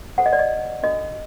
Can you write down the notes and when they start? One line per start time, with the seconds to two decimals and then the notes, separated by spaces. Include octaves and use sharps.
0.18 F#4 A4 C5 F#5
0.26 D#5
0.33 D5
0.39 D#5
0.83 D4 F#4 A4 D#5